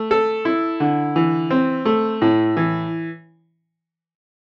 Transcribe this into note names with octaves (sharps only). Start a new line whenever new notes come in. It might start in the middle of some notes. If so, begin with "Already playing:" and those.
Already playing: A3
A4
E4
D3
E3
C4
A3
A2
E3